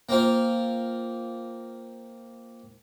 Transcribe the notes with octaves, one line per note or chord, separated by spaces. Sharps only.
A#3 C4 F4